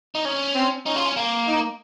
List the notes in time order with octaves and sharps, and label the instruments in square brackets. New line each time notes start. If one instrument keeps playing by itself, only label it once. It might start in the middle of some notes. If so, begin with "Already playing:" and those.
[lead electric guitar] D#4
C#4
[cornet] C4
[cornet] C#4 [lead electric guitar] D#4
[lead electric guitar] F4
C#4
A#3
[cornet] D#4